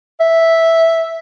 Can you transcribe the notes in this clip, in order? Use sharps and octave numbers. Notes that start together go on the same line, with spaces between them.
E5